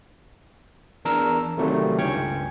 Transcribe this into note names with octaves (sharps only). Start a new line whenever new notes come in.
E2 D4 A#4 A#5 E6
C3 D#3 F#3 G3 A3
C#2 G2 C#4 C#5 G5 C#6